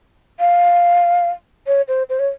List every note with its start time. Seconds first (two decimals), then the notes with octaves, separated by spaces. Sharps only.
0.40 F5
1.67 C#5
1.88 C5
2.09 C5
2.19 C#5